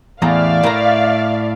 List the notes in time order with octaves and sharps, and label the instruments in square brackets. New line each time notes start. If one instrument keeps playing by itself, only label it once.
[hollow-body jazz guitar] E2 A2 A#5 [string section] D5 E5 F5
[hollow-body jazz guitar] A2 A#4 A#5